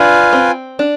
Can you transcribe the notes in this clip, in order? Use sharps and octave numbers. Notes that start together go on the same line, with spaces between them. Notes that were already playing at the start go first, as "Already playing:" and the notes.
Already playing: D4 F4 B4 F5 G#5
C4
D4